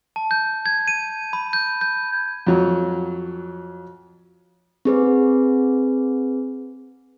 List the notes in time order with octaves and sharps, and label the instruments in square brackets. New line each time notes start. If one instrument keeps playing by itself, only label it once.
[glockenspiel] A5
G6
G#6
D#7
B5
G6
G6
[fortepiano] F2 F#3
[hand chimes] C4 G#4 B4